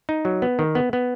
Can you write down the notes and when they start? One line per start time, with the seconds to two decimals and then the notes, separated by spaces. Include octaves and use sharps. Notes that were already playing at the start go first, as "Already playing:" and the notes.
0.09 D#4
0.25 F#3
0.42 B3
0.59 D#3
0.75 B3
0.93 B3